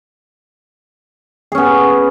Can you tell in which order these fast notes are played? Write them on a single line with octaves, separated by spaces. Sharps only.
G#4 C#4 B3